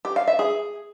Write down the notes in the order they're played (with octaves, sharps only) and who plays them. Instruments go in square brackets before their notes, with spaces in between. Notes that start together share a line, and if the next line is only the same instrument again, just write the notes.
[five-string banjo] G4
F5
E5
G#4